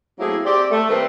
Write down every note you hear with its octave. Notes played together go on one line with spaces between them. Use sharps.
F#3 A3 A#3 C4 E4 G#4
C4 G4 D5
A3
D#3 G3 A3 C4 A#4 B4